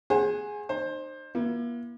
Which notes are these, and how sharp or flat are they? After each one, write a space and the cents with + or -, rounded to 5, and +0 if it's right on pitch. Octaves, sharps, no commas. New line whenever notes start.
G#4 +0 C5 +35 F#5 +0
D#4 -35 C5 +20
A#3 +45 E4 +40